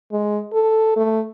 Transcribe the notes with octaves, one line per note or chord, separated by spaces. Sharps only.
G#3
A4
A3